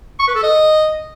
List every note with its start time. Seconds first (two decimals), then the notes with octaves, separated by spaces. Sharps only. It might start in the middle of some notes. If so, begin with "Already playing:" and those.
0.20 C#6
0.27 B4
0.35 A4
0.43 D#5